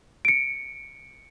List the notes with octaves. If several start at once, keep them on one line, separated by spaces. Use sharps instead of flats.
C#7 D7